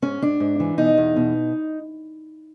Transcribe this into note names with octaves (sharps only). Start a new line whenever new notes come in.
G#2 C#4
G#2 D4
G#2
E3
B2 D#4
E2
B2